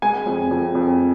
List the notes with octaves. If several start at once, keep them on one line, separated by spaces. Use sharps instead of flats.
G#3 G#5
F2
F2
F2